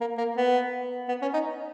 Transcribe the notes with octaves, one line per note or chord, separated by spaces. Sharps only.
A#3
A#3
B3
B3
C#4
D#4